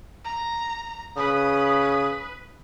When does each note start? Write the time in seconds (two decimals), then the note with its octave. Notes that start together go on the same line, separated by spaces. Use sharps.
0.25 A#5
1.17 C#3 B4 D#6